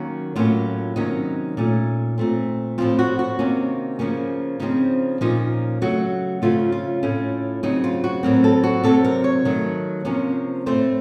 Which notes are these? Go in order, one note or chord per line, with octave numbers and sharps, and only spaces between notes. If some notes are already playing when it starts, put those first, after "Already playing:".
Already playing: D#3 F#3 A#3 C#4
A2 F#3 A#3 C#4 F4
C3 D#3 F#3 A#3 C#4 D#4
A#2 A3 C#4
A#2 A3 C4
A2 F3 C4 F4
F#4
F#4
C3 D#3 A#3 C#4
C#3 F3 A#3 C#4
C#3 F3 C4 D#4
A#2 F3 A#3 C#4 D#4
C#3 F#3 A3 F#4
C#3 F3 A3 C#4 F4
F4
A2 A3 C#4
C#3 F#3 C4 D#4
F4
F#4
A2 F#3 C4 A#4
A4
F#4
C3 F#3 C4 A4
A#4
C#5
D#3 F#3 A3
C3 F3 A#3 C#4
A2 A3 C4 C5